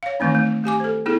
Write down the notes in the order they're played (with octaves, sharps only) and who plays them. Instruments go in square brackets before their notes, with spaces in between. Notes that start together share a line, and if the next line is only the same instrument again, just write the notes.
[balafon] C#5 F5
D#3 E3 A3 C4 D#4
A3
A3 G4 G#5 D6
A4 C5
B3 D#4 E4 G#4 A4